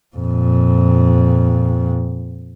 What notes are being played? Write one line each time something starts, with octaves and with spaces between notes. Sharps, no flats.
F2 A#2